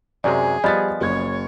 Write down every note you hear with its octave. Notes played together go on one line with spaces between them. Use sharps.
F#2 C3 G#3 G#4 D5
F3 G3 B3 D5 D#5 B5 A6
F#1 C#5 G#6